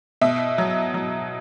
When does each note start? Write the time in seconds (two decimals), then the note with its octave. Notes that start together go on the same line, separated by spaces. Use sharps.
0.21 B2 E5
0.58 F#3
0.94 F#3